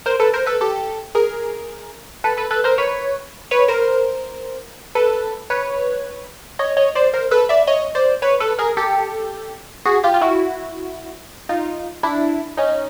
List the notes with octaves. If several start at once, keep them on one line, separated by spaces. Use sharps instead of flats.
A#4 C5
A4 B4
A#4 C5
A4 B4
G4 A4
G#4 A#4
A4 B4
A4 B4
A4 B4
A#4 C5
B4 C#5
B4 C#5
A#4 C5
A4 B4
B4 C#5
C#5 D#5
C#5 D#5
C5 D5
A#4 C5
A4 B4
D5 E5
C#5 D#5
C5 D5
B4 C#5
A4 B4
G#4 A#4
G4 A4
F#4 G#4
F4 G4
F4
E4 F#4
D#4 F4
D4 E4
C#4 D#4